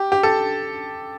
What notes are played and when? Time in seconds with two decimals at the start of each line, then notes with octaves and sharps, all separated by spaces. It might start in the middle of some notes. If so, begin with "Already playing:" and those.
Already playing: G4
0.12 G4
0.23 A4